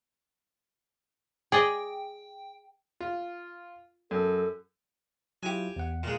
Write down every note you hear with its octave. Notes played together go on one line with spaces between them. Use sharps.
G#4 D5 D#5 G5
F4
F#2 A4
F#3 E4 F4 G4 G#5
E2 F#5
A#2 G#3 F5